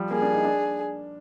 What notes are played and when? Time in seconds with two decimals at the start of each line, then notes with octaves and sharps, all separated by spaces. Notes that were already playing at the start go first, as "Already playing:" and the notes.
Already playing: F3 G3
0.11 A#3 G#4
0.22 D4
0.33 D#4
0.45 D4